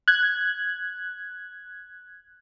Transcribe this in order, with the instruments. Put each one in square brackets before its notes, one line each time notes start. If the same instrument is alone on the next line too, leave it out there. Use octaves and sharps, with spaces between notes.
[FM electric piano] F#6 G#6